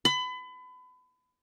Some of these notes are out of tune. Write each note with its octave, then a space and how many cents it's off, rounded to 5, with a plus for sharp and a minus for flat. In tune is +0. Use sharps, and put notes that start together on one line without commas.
B5 +30